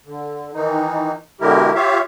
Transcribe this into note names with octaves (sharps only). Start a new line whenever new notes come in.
D3
D#3 E3 D#4
B2 D3 G#3 E4 G4 A#4
F4 G4 C#5 E5 F5